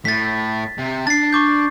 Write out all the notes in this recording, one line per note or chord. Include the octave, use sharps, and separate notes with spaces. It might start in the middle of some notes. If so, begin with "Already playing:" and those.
A2 A6 B6
C3
D4 A5 A6 C7
C#6 D6 G6